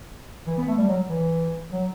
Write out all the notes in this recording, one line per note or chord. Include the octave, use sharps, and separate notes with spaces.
E3
B3
A3
G3
F#3
E3
F#3